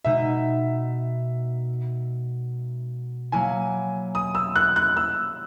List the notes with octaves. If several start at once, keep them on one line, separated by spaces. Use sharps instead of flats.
B2 G#3 D#4 E5
F#3 A#3 E4 G#5
D#6
E6
F#6
F#6
E6